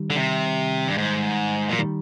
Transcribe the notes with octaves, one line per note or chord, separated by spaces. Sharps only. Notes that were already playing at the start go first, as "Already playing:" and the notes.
Already playing: D#3 G3
D3
C3
G2
G#2
A#2 F3
D#3 G3